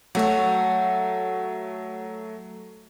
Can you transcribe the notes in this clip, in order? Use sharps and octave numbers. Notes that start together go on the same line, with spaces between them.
F#3 A3 F#4 C#5